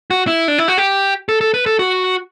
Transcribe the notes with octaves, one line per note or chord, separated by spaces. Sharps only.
F#4
E4
D4
E4
F#4
G4
A4
A4
B4
A4
F#4